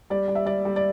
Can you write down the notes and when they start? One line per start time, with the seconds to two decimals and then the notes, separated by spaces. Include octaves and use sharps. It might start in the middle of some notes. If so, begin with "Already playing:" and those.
0.10 G3 D5
0.28 G3
0.35 E5
0.46 G3 D5
0.65 G3
0.76 D5